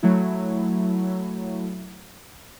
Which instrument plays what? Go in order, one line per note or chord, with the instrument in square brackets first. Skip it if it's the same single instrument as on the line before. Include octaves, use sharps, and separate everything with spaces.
[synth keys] F#3 A3 E4